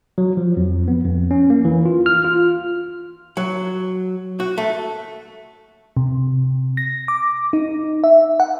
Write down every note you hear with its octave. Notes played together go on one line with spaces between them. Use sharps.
F#3
F3
F2
B3
F2
C#4
A#3
E3
F4
F6
F4
F#3
F#4
A3
C3
A#6
D6
D#4
E5
F#5